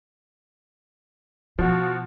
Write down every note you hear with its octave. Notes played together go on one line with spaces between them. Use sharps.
B2 F3 F#4